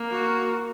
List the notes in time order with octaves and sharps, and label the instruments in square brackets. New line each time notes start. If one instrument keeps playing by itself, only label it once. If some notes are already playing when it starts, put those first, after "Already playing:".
Already playing: [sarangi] A#3
[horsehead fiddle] F#4